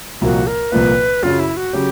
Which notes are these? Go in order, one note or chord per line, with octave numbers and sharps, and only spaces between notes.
C2 A#2 F3 A#3 F#4
A#4
C2 A#2 F3 A#3 B4
F#2 C#3 F#3 F4
E4
F#4
C#3 F#3 G4